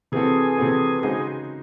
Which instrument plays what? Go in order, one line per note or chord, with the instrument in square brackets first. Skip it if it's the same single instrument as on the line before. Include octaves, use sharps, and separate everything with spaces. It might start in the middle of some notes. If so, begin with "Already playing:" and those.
[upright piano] C3 E3 C4 F#4 A4 [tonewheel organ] G#4
[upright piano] C3 E3 C4 F#4 A4
[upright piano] C#3 G#3 D#4 F#4 C5 [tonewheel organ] G#4